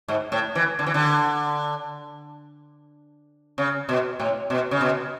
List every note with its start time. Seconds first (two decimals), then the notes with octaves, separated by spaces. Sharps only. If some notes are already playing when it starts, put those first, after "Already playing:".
0.08 G#2
0.32 A2
0.55 E3
0.79 D3
0.86 E3
0.94 D3
3.58 C#3
3.89 B2
4.20 A2
4.50 B2
4.71 C#3
4.81 B2